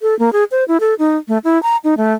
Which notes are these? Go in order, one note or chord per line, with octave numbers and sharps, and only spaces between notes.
A4
A#3
G#4
C5
E4
A4
D#4
A3
E4
A#5
D#4
A3